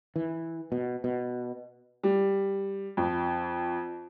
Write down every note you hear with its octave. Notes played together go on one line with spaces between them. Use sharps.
E3
B2
B2
G3
F2